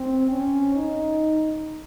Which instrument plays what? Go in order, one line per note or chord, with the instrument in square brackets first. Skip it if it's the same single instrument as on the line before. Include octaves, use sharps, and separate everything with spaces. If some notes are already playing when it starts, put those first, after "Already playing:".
Already playing: [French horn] C4
C#4
D#4